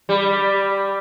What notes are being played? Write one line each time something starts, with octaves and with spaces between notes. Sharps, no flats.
G3